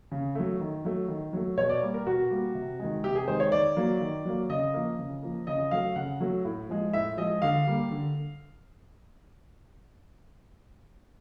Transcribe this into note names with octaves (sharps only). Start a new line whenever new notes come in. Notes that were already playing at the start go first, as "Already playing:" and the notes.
C#3
F#3 A3
D#3
F#3 A3
D#3
F#3 A3
B2 C#5
D5
G3 A#3
A#4
B2 F#4
G3 A#3
C3
D#3 G#3
C3 G4
G#4
D#3 G#3 C5
C#5
D#3 D5
F#3 A#3
D#3
F#3 A#3
C#3 D#5
F3 A#3
C#3
F3 A#3
C#3 D#5
F#3 A3 F5
C#3 F#5
F#3 A3
A2
F3 G#3
A2 E5
F3 G#3 D#5
D3 F5
G3 A#3
D3